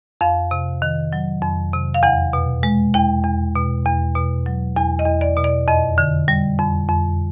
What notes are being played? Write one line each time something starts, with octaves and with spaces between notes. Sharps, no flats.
F2 F5
C3
D#3
F#3
F2
C3
F5
E2 F#5
B2
G#3
E2 G5
E2
B2
E2
B2
F#3
E2 G#5
D#5
E2
D5
B2
D5
F2 D#5
D3
G3
F2
F2